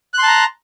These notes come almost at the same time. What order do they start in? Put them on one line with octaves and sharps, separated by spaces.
F#6 C6 A5 A#5